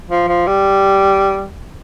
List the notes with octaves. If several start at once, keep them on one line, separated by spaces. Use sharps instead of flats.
F3
F3
G3